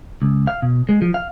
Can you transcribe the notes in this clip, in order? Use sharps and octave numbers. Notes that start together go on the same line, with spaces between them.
C#2
F5
B2
G#3
F3
F5